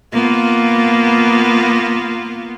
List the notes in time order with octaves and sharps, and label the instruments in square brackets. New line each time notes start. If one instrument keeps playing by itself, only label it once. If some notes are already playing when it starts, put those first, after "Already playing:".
[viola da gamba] A#3 B3 F4